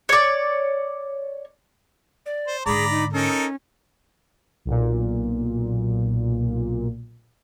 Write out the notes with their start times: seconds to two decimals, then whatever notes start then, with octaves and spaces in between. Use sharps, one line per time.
0.09 C#5 D5
2.26 D5
2.47 C5
2.66 G#2 D3 G#4 D5 A#5 B5
2.91 D#4
3.13 C#4 D#4 A4 A#4
4.65 B1 A#2